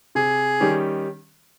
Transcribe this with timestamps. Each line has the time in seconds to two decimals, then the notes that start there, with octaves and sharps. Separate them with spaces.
0.15 C3 G#4
0.60 D#3 G3 C#4 G4